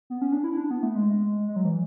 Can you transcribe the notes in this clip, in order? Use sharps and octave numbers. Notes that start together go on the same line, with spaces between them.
B3
C#4
D4
E4
D4
B3
A3
G#3
G#3
F#3
E3